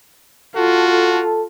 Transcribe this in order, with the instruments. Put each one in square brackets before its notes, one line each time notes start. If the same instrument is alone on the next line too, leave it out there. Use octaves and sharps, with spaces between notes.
[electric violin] F4 [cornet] F#4 [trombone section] A4